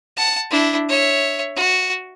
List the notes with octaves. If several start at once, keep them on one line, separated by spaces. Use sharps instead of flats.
F#5 A5
D4 E4
C#5 E5
F#4